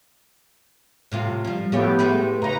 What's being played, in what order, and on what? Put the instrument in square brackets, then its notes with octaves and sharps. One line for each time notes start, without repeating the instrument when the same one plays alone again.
[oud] A2 C3 F4
F3 G3
[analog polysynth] A2 B3 G4 [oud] F3 A3 C#5
[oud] G#3 A3 B4
[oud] C#3 D#4 [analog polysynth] B4 A#5